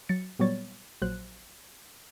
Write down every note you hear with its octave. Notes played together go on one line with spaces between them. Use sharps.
F#3 A6 C#7
A#2 F#3 G3 B3 C#5 A6
A#1 F#3 C5 F#6